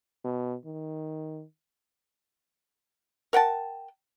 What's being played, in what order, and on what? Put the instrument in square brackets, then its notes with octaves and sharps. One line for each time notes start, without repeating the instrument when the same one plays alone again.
[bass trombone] B2
D#3
[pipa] A#4 F#5 G5 A5